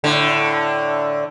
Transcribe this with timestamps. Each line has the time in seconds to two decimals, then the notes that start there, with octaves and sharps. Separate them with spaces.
0.04 A2 D3